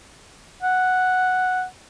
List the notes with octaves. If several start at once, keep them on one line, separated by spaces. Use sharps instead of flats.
F#5